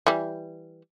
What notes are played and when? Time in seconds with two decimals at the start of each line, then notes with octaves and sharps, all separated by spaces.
0.07 E3 G3